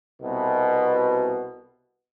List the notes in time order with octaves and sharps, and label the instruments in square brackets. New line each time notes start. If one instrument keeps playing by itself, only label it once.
[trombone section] C2 B2